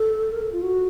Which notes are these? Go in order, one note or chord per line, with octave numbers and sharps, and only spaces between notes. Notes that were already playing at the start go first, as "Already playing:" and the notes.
Already playing: A4
A#4
A4
F4
F#4